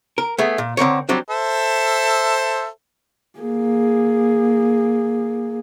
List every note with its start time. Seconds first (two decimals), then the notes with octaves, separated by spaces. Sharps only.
0.18 A#4
0.38 A3 B3 G#4
0.58 A#2
0.77 D3 C4 A#4 C#5
1.09 F#3 G3 C4 D4 F#4
1.29 A4 C5 E5
3.40 A#3 G#4